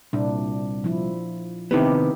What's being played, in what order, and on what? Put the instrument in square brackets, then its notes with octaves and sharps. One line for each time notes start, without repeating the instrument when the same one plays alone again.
[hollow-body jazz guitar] C2 [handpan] A#2 D4
[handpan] F3 E4
[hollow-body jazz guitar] C3 D#3 B3 [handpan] D#4 E4 G4